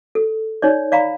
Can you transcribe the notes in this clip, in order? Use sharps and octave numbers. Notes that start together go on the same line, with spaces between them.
A4
D#4 C#5 D5
D5 F5 A#5 B5